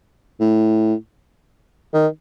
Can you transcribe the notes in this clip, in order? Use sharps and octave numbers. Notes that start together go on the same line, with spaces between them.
A2
D#3